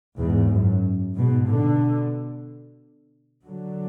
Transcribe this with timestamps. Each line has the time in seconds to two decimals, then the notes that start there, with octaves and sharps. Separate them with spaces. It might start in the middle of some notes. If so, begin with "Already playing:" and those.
0.17 E2 G#2
0.50 F#2
1.15 G#2 B2
1.48 B2 D3
3.46 D3 F#3